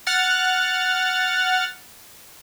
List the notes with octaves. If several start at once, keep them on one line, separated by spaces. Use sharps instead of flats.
F#5 F6 A6